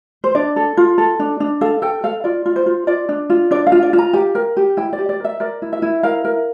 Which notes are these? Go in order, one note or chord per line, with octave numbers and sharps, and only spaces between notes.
C5
D4 D5
A4
F4
A4
D4
D4
A4 F5
A4 G5
A4 F5
F4 D5
F4
C5
F4
F4 D5
D4
F4
D4 D5
F5
F4
D5
F4
A#5
G4 G5
A#4
G4
E4 G5
D5
G4
D5
A#4 E5
A#4 D5
E4
E5
E4
A#4 F5
A#4